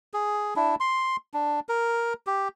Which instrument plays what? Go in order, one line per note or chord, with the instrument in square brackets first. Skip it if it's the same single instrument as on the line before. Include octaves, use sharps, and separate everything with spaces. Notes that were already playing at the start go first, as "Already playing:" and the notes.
[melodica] G#4
D4 E4
C6
D4
A#4
G4